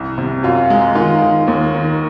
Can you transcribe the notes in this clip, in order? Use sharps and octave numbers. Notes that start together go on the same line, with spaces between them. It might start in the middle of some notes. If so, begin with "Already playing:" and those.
Already playing: C2
C3
F#2 F4
G#3
D#3 F4
D#3
D#2
D#3